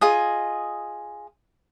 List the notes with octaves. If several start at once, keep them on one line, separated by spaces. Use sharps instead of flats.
F4 G#4 D#5